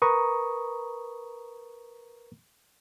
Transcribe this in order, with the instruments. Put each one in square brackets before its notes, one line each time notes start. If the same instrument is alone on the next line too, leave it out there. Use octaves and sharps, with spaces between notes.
[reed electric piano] A#4 B4 A#5 C#6 D#6